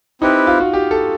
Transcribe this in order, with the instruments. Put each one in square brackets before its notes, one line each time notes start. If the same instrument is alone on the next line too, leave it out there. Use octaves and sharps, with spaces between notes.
[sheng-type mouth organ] C4 E4 G4 B4 [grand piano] D#4
[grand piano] F4
F#4
G4
A4